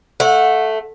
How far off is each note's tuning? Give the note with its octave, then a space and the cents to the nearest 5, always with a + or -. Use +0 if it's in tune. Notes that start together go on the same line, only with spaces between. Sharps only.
A3 +0 F#5 -25